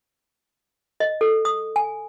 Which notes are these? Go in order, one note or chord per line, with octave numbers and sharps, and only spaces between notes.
D#5
A4
D#6
G#5